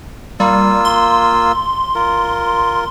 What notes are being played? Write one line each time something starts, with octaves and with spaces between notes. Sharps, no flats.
G3 A#3 F4 E6
C6
F4 A#4